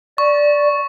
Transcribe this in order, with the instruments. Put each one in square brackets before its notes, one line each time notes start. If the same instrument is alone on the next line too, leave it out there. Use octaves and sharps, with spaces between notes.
[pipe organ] D5 [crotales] C#6